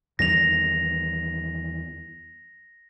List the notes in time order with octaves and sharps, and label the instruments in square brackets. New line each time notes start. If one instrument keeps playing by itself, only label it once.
[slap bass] E2 D#3 G3 [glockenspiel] A#6 F7